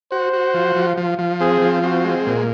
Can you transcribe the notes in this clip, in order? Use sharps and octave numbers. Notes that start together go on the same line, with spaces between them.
F#4 C5
F#4
F3
F3
F3
F3
C4 G#4
F3
C4 F#4
G#3
A#2